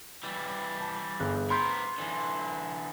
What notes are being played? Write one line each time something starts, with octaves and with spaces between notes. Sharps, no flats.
E3 G3
A5
G1 G#4 F#6
B3 A#4 B5 C6 G6
D3 E3